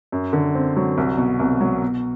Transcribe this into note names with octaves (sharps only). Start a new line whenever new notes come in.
F#2
D3
C4
F#3
C2
B2
C2
F#3
B2